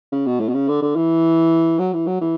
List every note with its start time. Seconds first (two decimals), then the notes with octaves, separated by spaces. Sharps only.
0.12 C#3
0.26 B2
0.40 A2
0.49 B2
0.54 C#3
0.68 D3
0.82 D3
0.96 E3
1.79 F#3
1.93 E3
2.07 F#3
2.21 E3